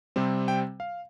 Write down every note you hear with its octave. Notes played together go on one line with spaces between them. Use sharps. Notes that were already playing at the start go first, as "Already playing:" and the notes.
C3 G3 C4
G5
F5